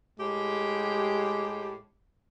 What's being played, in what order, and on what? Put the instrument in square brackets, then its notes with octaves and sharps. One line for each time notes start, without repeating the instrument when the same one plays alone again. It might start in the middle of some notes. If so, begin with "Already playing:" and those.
[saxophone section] A2 G4 [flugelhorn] G#3